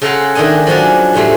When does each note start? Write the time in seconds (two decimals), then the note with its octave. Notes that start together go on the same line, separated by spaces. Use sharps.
0.02 C#3 A4 F5 F#5 A#5 C6
0.35 D#3 A3 D4 D#5 G#5
0.67 F3 F#3 C#4 D4 F#4
1.13 F2 A2 C3 G#3 A3